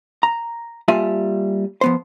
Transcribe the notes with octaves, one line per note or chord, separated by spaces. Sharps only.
A#5
G3 A#3 F4 E5 G#5 A5
F3 B3 C5